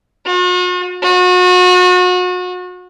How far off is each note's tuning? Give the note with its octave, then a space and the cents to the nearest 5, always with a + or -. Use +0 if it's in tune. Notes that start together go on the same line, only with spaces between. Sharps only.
F#4 -45
F#4 -35